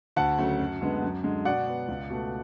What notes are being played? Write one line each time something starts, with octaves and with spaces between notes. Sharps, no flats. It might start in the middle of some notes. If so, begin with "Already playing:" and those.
D2 F#5 A5
C#3 F#3 A3
F#2
D3 G#3 B3
F#2
D3 G#3
B2 D5 F#5
F#3 B3
C#2
B2 A3